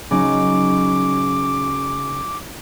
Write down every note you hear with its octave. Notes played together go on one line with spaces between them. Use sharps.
C#3 F#3 D#4 D6